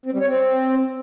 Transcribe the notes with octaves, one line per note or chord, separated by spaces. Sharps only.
C4
G3
C#5
C4